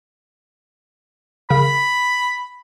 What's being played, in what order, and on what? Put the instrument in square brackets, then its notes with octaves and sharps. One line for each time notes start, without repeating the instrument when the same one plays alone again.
[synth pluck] C#3 A#4 [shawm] B5